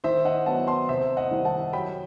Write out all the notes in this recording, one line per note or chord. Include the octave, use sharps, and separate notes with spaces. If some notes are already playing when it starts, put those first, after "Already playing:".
D#3 C5 E5
D#5 F#5
F#3 B3 F#5 A5
A5 C6
C3 C5 E5
D#5 F#5
D#3 G3 C4 D#4
F#5 A5
F#3 G5 B5